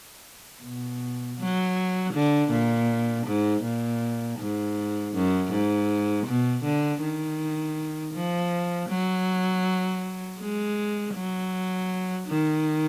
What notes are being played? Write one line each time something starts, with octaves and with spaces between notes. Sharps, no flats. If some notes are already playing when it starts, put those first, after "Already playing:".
B2
F#3
D3
A#2
G#2
A#2
G#2
F#2
G#2
B2
D3
D#3
F3
F#3
G#3
F#3
D#3